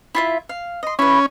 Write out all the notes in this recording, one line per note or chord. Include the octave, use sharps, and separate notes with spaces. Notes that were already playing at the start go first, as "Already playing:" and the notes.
E4 F4 E5
F5
D#5 C6
C#4 E4 B4